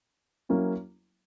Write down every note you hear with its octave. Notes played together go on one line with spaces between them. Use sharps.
F#3 A#3 C#4 E4